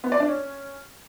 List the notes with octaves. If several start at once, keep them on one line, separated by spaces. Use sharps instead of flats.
B3
D5
D4
C#4